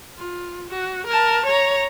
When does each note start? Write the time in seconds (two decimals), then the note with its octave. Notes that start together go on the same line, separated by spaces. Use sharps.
0.15 F4
0.69 F#4
1.06 A#4 A5
1.46 C#5 A#5